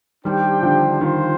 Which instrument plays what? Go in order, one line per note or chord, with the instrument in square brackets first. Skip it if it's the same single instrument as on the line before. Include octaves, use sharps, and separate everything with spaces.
[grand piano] D#3 G3 [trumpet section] D4 G4 C5 G5
[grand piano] D3 F3
[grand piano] D#3 [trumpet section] F4 C5 G5